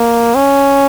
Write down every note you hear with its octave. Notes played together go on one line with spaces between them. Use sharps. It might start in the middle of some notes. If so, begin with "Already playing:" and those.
Already playing: A#3
C#4